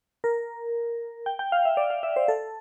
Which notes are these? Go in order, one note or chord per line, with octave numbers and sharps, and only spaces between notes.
A#4
G5
G5
F5
E5
D5
F5
E5
C5
A4